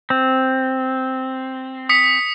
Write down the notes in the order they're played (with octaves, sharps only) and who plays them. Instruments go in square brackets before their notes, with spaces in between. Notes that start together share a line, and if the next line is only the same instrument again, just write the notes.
[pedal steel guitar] C4
[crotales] D#6 B6 C#7